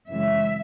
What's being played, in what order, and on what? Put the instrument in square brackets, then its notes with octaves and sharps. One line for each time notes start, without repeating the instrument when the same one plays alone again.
[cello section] F#2 C#3 E3 G#3 E5